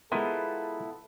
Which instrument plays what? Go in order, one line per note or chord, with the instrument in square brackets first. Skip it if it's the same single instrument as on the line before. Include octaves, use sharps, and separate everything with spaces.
[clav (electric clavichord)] G#3 A#4 [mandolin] B3 F4 [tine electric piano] E4 [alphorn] A4